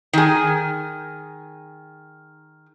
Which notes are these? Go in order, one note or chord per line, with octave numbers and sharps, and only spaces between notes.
D#3 G#4